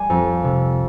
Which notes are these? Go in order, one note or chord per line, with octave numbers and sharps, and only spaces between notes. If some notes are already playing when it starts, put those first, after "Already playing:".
Already playing: G3 G#5
F2
C3